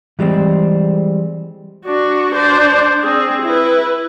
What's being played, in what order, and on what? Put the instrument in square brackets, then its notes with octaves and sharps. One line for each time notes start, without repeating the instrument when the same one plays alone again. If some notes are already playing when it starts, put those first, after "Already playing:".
[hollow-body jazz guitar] E3 G3 G#3 C4
[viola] D4 F#4
D4 C5
C4 G#4
E4 B4